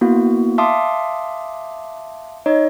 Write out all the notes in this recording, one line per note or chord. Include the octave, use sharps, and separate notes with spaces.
A#3 B3 E4 F#4
E5 F5 A5 C6 D6 D#6
D#4 C#5 D#5